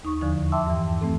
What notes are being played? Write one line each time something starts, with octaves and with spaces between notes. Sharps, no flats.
D#2 D#4 C#6
E2 D3 F3 D#4
E5 G5 A5 C6 D6 E6
G2 E3
E3 A3 C4 A4